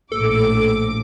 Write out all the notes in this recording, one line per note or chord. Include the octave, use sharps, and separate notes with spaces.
A#1 A2 A4 D6